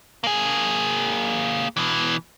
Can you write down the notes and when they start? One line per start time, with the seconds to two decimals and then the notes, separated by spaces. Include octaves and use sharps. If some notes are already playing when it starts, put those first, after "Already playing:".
0.24 A#3 G#4
1.77 B2 E3